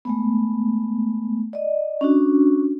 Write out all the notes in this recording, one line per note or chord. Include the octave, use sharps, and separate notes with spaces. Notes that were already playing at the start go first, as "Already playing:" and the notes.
G#3 A3 B3
D5 D#5
C#4 D4 F#4